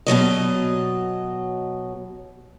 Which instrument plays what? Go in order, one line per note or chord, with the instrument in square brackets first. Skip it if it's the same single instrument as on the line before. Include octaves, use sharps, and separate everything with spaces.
[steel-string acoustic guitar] B2 F3 F#3 D#5